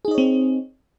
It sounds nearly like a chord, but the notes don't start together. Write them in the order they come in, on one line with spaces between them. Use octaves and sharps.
G#4 D#4 D#5 C#5 C4